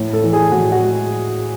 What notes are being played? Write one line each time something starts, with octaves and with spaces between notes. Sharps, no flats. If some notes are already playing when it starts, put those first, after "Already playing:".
Already playing: A2
A4
E3
G#4
A2 F#4
F#4
G#3